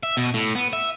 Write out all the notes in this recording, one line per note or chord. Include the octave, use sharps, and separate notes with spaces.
E5
B2
A2
B3
E5